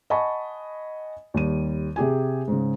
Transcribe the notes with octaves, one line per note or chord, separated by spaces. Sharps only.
D#5 F#5 G#5 A5 B5 C#6
D#2 G3 D#7
C3 G4 G#4 G#5
G#2 C#3